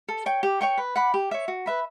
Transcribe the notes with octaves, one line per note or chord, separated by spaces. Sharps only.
A4
C#5 G5
G4
C#5 G5 C#6
B4
F#5 B5 D6
G4
C#5 E5
F#4
B4 E5 B5